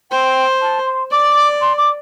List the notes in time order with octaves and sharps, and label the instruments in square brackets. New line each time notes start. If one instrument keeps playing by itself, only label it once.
[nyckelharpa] C5 [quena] G5
[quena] A5
C6
[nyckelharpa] D5 [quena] D6
[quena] C6
D6